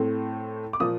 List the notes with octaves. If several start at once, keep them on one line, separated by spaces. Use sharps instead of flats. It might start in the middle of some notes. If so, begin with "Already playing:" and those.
Already playing: A2 A3 C4
D6
A#2 F3 A#3 D#6